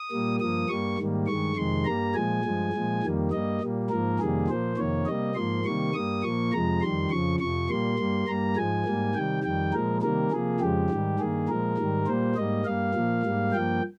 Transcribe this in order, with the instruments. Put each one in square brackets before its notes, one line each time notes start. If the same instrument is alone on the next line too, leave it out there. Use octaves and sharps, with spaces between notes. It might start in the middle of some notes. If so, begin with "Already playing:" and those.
Already playing: [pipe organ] D#6
A#2 G3 A#3
G2 F3 A#3 D#6
G2 G3 A#3 C#6
G#2 D#3 G3 A#3
G2 D#3 G#3 C#6
F2 C3 D#3 G#3 C6
G2 G3 A#3 A#5
A#2 F3 G#3 G#5
G2 F3 G#3
A#2 F3 G#3
F2 D#3 G3 A#3
G2 G3 A#3 D#5
A#2 G3 A#3
G#2 F3 A#3 A#4
F2 C3 D#3 G3 A#3 G#4
A#2 F3 A#3 C5
F2 C3 D#3 A#3 C#5
C3 G3 A#3 D#5
G#2 F3 A#3 C6
C3 D#3 G3 A#3 C#6
G2 G3 A#3 D#6
A#2 F3 A#3 C#6
F2 C3 F3 G#3 A#5
F2 D#3 G3 C6
F2 C#3 F3 C#6
F2 C3 F3 C#6
A#2 G3 A#3 C6
G2 G3 A#3
G2 G3 A#3 A#5
G#2 F3 G#3 G#5
G#2 G3 A#3
C3 D#3 G3 G5
F2 D#3 G3 G5
A#2 F3 G#3 A#4
C3 D#3 G3 A#3 A#4
C3 F3 A#3 G#4
F2 C#3 F3 G#3 G4
G#2 D#3 G3
G2 D#3 A#3 G#4
A#2 F3 G#3 A#4
G#2 D#3 G3
A#2 G3 A#3 C5
G#2 G3 A#3 D#5
G2 G3 A#3 F5
A#2 F3 A#3
G#2 G3 A#3
G2 F3 A#3 G5